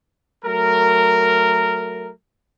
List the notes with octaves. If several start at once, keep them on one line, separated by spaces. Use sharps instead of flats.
F#3 A3 A#4